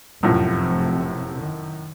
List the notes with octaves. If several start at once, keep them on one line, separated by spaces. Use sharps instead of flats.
F1 F#2 A2 C3 F3
D#3